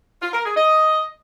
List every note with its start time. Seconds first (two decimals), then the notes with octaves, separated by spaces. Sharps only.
0.22 F4
0.33 A#4
0.45 G#4
0.56 D#5